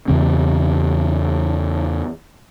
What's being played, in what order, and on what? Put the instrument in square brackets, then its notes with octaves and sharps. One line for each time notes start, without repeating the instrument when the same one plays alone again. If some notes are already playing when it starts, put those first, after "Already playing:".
[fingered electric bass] E2 C#3 C4